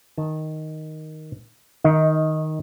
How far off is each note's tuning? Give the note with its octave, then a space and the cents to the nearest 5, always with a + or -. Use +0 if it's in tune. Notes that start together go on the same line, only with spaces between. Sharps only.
D#3 +0 A5 -5
D#3 +0 D#4 +15 D#5 +30